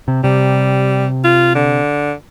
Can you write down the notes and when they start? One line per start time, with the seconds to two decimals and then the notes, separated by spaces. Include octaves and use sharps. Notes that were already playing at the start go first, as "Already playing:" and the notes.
0.08 C3
0.24 C3 G3
1.24 F4
1.55 D3